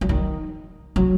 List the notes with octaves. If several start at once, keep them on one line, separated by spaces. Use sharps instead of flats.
F#3
D#3
F#3